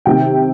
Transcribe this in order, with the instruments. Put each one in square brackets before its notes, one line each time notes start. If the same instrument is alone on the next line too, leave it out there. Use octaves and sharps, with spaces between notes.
[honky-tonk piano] C3 D#3 G5